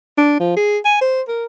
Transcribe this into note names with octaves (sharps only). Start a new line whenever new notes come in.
D4
F3
G#4
G#5
C5
A#4